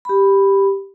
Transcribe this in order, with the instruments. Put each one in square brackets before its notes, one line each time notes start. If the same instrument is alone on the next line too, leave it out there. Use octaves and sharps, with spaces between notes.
[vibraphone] G4 B5